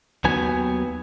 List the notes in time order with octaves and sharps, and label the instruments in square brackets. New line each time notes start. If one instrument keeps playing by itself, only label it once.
[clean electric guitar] D#2 D#3 F#3 B3 G#5